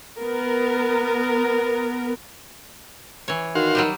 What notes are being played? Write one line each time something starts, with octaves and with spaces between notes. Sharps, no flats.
B3 A#4
E3 C#5
D#3 F#4 F5 C6
F#3 G3 G4